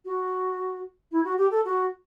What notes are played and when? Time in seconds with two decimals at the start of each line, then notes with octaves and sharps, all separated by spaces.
0.05 F#4
1.12 E4
1.24 F#4
1.38 G4
1.51 A4
1.65 F#4